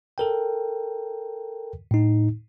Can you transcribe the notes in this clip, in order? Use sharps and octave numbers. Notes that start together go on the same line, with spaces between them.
A4 A#4 G5
A2 D#4